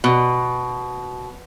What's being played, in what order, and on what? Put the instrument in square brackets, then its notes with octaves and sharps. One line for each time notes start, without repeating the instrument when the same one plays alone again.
[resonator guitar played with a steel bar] B2